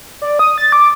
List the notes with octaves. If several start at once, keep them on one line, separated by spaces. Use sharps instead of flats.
D5
D#6
A6
D6